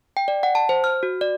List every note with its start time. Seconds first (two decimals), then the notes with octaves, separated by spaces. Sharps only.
0.17 G5
0.28 D5
0.43 F#5
0.55 A5
0.69 C5
0.84 F6
1.03 F#4
1.21 D5